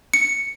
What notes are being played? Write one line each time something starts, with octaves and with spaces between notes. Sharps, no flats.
C#7